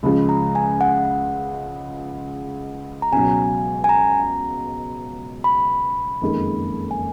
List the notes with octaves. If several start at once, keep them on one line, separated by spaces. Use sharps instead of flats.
C#2 C#3 F3 G#3 B5
A#5
G#5
F#5
A#5
C#2 B2 F#3 G#5
G#5
A#5
B5
F#1 F2 D#3 G#3
G#5